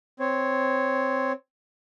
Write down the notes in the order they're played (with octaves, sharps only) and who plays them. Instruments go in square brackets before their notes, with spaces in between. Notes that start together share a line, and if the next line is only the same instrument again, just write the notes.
[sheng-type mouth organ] C4 C#5